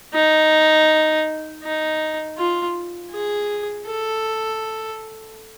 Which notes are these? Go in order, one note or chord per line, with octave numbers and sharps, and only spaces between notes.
D#4
D#4
F4
G#4
A4